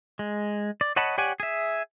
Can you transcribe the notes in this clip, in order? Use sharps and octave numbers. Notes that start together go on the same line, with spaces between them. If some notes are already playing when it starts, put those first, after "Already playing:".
G#3
D5
C#5 D#5 F#5 A5 B5
G4 C#5 D5 F#5 G#5
G#4 E5